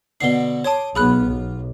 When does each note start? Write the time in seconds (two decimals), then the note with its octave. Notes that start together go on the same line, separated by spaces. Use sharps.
0.21 B2 D3 D4 C7 G7
0.64 C#5 A5 C6 D6 D#6
0.95 B1 B3 F4 G#4 B5 F#6
1.25 B1